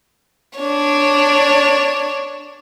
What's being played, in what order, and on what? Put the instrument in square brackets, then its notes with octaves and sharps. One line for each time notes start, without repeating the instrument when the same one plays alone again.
[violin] D4 C#5